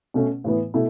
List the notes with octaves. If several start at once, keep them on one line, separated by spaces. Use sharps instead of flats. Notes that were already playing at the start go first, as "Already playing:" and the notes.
B2 A3 C#4
A2 E3 B3
B2 A3 E4